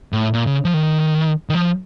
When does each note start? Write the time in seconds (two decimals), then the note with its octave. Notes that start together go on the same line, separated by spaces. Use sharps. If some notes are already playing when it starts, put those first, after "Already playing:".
0.13 A2
0.34 A#2
0.47 C#3
0.65 F3
0.74 D#3
1.50 D#3
1.55 F3